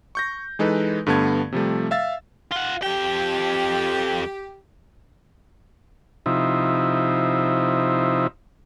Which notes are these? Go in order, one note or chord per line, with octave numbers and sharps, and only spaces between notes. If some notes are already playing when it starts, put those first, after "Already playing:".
C#6 G6 A#6
E3 G#3 D#4 A4 B4
G2 D3 A3 B3 A5 G#6
C3 F3 G3 A3
E5 F5 E6 A6
F4 F#5
F2 G4 G5
C3 F3 D#4 E4